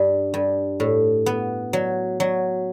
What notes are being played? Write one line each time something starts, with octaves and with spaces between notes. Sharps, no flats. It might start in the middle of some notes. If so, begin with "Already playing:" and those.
Already playing: G2
G2
A2
B3
F#3
F#3